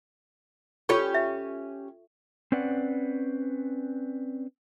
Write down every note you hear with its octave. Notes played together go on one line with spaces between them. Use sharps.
C#4 F4 G4 A4 C#5 C#6
E5
C4 C#4 B4 D5 F#5